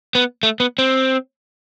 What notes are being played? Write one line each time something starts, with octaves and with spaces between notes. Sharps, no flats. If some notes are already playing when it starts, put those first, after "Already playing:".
B3
A3
B3
C4